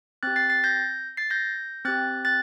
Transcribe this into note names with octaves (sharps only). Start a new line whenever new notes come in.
C4 G4 F#6 A6
A6 C7
A6 C7
G6 A#6
A6 C7
G6 A#6
C4 G4 F#6 A6
F#6 A6